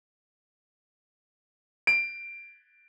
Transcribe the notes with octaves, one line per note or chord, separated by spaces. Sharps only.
D7